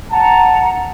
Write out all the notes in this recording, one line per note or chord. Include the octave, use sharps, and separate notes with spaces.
F#5 A5 A#5